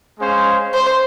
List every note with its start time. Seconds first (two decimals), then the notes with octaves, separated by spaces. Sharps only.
0.17 G#3 C#4 G#4 C5 F5
0.74 C5